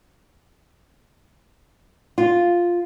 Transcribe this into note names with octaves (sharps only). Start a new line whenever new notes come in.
F4